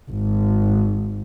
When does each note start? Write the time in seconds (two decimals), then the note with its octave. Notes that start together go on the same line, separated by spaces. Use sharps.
0.11 G#1